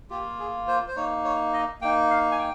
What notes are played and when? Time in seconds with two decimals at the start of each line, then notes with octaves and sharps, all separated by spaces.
0.10 A#3 F4 G4
0.39 G#4
0.68 C5
0.88 C5
0.96 A#3 D#4 C#5
1.25 C#5
1.53 D#5
1.81 A#3 D#4 G5
2.10 F5
2.31 G#5
2.39 G5